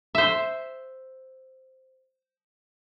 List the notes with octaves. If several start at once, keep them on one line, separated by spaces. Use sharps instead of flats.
C5 E5